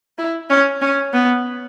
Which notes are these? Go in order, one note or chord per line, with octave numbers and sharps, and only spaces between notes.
E4
C#4
C#4
B3